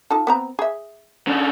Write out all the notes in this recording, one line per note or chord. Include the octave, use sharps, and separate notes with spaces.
D#4 F4 A4
B3 C4 A#5
G#4 E5
C#3 D4